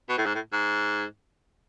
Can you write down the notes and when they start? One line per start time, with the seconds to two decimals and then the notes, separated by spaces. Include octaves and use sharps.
0.09 B2
0.17 A2
0.26 G#2
0.35 A2
0.53 G#2